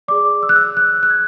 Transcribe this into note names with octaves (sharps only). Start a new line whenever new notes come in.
G#4 D5 D6
E6
F#6
E6
F#6
F#6
G#6